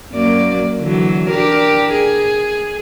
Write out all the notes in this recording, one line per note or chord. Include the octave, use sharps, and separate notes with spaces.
F#2 A#3 D5
D3 E3 F#3
D4 G4 A#4
G#4